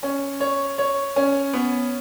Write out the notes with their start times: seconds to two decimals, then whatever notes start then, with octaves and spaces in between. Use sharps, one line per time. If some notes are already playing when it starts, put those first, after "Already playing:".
0.03 C#4
0.40 C#5
0.78 C#5
1.16 C#4
1.53 B3